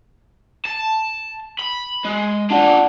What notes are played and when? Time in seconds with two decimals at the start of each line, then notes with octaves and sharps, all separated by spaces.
0.65 A5
1.59 B5
2.05 G#3
2.50 D4 F4 D5 F#5 A5